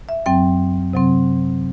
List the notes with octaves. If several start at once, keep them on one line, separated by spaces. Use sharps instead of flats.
E5
F#2 F#3 C4 G5
C3 F#3 C4